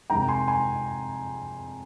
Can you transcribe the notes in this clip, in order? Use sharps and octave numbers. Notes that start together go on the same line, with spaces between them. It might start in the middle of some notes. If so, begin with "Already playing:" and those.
F2 C3 D#3 G#3 G5 A#5
G#5 C6
G#5 C6